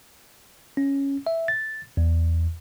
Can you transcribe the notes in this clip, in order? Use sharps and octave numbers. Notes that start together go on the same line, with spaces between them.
C#4
E5
A6
E2